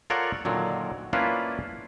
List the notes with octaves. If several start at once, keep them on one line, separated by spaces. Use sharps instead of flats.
F4 A4 A#4 C#5 D5 F#5
A#2 D3 D#3 F#3
A#3 C#4 D4 E4 F4 B4